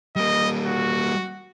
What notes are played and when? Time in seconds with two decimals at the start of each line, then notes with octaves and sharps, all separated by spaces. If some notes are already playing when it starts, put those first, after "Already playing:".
0.16 G3 A#3 D#5
0.66 F#4